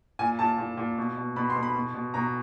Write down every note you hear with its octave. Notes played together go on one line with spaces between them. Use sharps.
A#2 G#5
A#2 A5
A#2
A#2
B2
B2
B2 B5
C6
B2
B5
B2
B2
B2 A#5